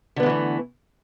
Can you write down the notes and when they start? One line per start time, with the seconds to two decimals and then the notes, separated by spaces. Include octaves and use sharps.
0.16 D3
0.20 B3
0.23 G#3
0.26 E3
0.29 A3